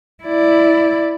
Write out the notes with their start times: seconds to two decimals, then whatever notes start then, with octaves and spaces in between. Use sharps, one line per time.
0.24 E4 D5